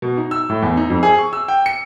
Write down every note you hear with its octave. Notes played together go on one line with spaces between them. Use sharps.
B2
D#4
E6
A2
E2
D#4
F2
G#4
C#6
E6
G5
C#7